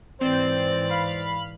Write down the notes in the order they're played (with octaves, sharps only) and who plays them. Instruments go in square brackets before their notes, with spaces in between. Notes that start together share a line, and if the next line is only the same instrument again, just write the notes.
[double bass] G#2 E3 [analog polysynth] C4 [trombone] C5 [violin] D5
[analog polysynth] F5 B5